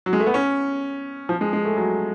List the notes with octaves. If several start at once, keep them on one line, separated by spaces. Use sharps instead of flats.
F#3
G#3
A3
B3
C#4
F3
G#3
G#3
A3
F#3